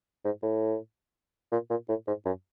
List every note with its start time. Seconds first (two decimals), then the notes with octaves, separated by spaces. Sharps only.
0.25 G#2
0.43 A2
1.52 A#2
1.70 A#2
1.89 A2
2.07 G#2
2.26 F#2